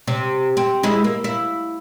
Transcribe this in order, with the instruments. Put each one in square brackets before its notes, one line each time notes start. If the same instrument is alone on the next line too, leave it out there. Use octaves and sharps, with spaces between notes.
[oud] C3
C4
G#3 E4
A#3
E4